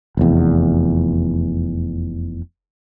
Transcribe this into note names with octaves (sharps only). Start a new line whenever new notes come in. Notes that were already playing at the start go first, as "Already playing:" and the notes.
F1 E2